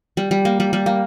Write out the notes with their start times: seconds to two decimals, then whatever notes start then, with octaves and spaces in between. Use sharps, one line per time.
0.17 G3
0.31 G3
0.45 A#3
0.60 G3
0.73 G3
0.86 A#3